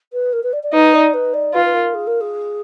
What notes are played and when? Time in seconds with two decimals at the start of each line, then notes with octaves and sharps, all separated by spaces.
0.13 B4
0.32 A#4
0.43 B4
0.53 D5
0.63 D5
0.73 D#4 B4
0.94 D5
1.13 B4
1.33 D5
1.54 F4 B4
1.65 B4
1.73 A#4
1.94 G#4
2.07 A#4
2.20 G#4